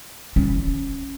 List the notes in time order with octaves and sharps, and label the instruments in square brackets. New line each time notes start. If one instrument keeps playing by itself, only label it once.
[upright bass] C#4